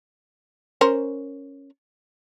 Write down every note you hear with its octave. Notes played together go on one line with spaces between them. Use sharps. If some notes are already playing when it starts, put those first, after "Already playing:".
C#4 A#4 C5